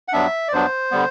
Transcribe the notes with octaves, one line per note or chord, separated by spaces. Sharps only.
F#5
G2 F#3 B3 D4 E5
D5
G2 F#3 B3 D4 C5
D3 G3 B3